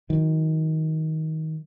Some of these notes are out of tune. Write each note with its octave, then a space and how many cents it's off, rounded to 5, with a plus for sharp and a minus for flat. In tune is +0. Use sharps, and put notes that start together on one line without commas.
D#3 +20 F#3 -20